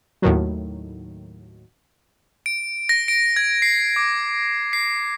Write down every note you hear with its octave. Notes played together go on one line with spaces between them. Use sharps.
D#2 A2 D#3 F#3
D7
A#6
D7
G#6
C7
D6
C7